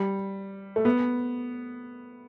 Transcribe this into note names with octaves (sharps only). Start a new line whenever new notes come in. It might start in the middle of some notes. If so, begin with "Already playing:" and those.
Already playing: G3
A3
B3